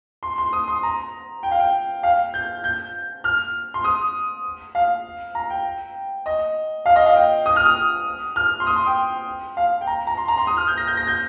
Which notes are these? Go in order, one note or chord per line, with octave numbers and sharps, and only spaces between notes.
C6
C6
D#6
C6
A#5
G5
F5
G5
F5
G6
G6
F6
C6
D#6
F5
A#5
G5
D#5
F5
D#5
F5
G5
D#6
F6
D#6
F6
C6
D#6
C6
G5
F5
G5
A#5
A#5
C6
A#5
C6
D#6
F6
G6
A#6
G6
A#6
G6